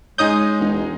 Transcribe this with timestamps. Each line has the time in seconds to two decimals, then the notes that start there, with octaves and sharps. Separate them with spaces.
0.18 G#3 C#4 D#4 G#4 D#6 G6
0.59 E1